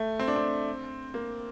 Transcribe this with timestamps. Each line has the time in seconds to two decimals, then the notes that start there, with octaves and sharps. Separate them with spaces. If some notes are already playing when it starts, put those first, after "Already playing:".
Already playing: A3
0.19 C4
0.28 D4
0.36 C4
1.14 A#3